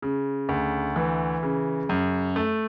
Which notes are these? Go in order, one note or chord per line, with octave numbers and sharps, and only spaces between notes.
C#3
D2
E3
C#3
F#2
A3